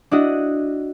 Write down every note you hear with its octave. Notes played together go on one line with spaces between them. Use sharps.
D4 E4 F#4 D#5 F#5